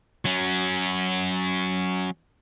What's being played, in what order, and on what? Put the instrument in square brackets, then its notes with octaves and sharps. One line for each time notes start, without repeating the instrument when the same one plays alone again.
[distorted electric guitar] F#3 C#4